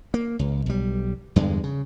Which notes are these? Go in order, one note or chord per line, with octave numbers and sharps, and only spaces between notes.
A#3
C#2
B1 G3
E2 G2 D3 G#3
C#3